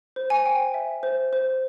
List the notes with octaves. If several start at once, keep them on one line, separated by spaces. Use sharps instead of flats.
C5
G#5
G5
E5
C5
C5